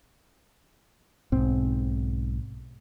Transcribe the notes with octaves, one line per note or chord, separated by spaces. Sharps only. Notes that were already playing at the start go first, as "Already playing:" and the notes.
B1 G#2 C4